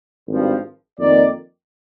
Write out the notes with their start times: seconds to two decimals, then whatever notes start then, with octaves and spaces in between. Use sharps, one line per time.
0.27 G#1 G2 F3
0.99 F2 D#3 A#3 D5